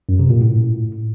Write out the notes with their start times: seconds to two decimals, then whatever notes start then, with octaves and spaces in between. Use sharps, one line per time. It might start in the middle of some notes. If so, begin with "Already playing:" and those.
0.09 F#2
0.19 C3
0.30 A#2
0.41 A2